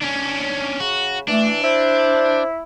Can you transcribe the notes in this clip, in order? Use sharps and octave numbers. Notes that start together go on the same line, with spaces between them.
C#4 D4
C#3 F#4
E3 A3 D4
E4 C5